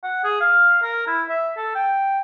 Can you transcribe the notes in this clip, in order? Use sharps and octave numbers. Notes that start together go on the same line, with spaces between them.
F#5
G#4
F5
A#4
E4
E5
A4
G5